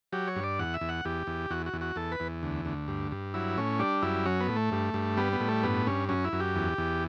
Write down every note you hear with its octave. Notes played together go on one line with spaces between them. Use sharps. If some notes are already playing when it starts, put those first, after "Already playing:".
F#3 G4
C#5
G2
D5
E2 F#5
E5
E2
F#5
E2 G4
E2
E2 F#4
F#4
E2
F#4
E2 A4
B4
E2
D2
D2
G2
G2
F#3 E4
A2 C#4
G3 D4
F#2 E4
F#3 C#4
B3
A2
A3
G2
G2
G3 B3
B3
A2
A3
G2 B3
G2 C#4
F#2 C#4
E4
F#2
G4
E2
E2